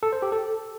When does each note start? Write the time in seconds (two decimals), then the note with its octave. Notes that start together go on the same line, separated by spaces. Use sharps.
0.03 A4
0.12 C5
0.22 G4
0.32 A4